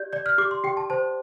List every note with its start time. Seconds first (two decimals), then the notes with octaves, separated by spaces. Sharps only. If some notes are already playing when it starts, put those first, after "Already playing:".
Already playing: G4 D5 G6
0.13 D5 G6
0.26 F6
0.38 G4 D6
0.51 C6
0.64 G4 G5
0.77 A5
0.90 C5 A5